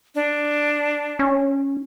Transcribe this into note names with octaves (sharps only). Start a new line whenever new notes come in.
D4
C#4